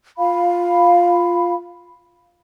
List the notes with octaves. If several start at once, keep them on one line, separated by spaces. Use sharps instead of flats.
F4 F5 B5